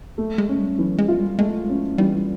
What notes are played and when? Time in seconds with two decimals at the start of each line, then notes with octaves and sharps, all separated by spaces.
0.18 A3
0.38 G#3
0.49 C#4
0.58 G3
0.78 E3 F#3
0.98 G#3
1.08 F4
1.19 G3
1.39 G#3 A3
1.69 C#4
1.98 E3 G3